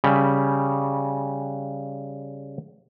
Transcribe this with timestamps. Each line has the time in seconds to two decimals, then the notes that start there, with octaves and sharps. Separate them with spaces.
0.04 C#3 G3